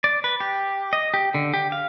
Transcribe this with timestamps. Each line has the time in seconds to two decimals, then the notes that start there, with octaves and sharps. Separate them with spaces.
0.04 D5
0.24 B4
0.40 G4
0.93 D#5
1.14 G4
1.34 D3
1.54 G4
1.72 F5